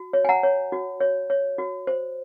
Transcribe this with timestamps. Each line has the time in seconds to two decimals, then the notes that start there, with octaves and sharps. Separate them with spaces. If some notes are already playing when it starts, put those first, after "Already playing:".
Already playing: F#4
0.13 C#5
0.25 G#5
0.29 F#5 A#5
0.43 C#5
0.72 F#4
1.00 C#5
1.30 C#5
1.58 F#4
1.87 C5